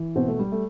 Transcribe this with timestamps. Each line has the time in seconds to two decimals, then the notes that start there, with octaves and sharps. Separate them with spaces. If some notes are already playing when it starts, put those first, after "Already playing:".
Already playing: E3
0.15 B2 C4
0.27 A3
0.39 G3
0.52 A3